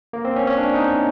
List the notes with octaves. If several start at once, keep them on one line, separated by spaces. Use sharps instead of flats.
A#3
C4
C#4
C#4
D4
D#4